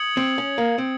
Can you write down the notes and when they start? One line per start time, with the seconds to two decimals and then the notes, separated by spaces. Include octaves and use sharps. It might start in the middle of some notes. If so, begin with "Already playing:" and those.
Already playing: D#6 G#6 C#7 F#7
0.17 C4
0.38 C#4
0.58 A#3
0.78 C4